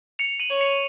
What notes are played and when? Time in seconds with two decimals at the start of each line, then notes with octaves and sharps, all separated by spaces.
0.19 C#7 F7
0.40 D#7 F#7
0.50 C#5
0.61 C#7 F7